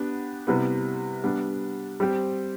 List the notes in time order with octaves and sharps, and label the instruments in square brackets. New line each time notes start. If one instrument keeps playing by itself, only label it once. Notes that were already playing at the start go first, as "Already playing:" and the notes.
Already playing: [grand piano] B3 D4 G4
C3 G3 B3 E4 B4
G3 B3 D4
G3 C4 G4 C5